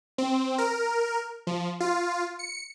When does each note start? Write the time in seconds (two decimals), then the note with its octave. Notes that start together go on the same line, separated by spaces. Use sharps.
0.18 C4
0.58 A#4
1.47 F3
1.80 F4
2.39 C#7